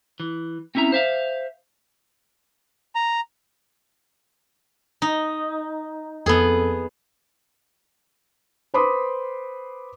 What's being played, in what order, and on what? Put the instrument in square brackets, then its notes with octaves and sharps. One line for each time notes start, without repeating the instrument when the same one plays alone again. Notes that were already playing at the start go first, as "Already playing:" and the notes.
[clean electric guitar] E3
C4 C#4 E4 E5 A#5
C5 E5 F5
[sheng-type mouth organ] A#5
[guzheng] D#4
[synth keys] F2 A4 [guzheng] B3 G#4
[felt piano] B4 C5 B5 C6 D6 D#6